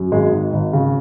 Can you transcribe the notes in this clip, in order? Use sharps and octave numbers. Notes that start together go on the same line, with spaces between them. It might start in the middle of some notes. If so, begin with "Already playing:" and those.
Already playing: F#2
G#1 G#3
D#3
G#1
C#3